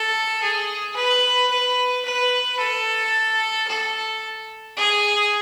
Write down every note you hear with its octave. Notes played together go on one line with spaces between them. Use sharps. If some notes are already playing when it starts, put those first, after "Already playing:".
Already playing: A4
G#4
B4
B4
B4
A4
A4
G#4